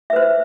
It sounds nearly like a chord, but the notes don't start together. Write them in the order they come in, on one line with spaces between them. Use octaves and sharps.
E5 B4 C5